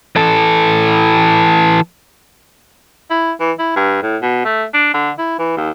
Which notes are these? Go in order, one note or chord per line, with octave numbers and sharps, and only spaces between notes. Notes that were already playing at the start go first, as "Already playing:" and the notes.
E3 A4
E4
E3
E4
G2
A2
B2
A3
D4
D3
E4
E3
D#2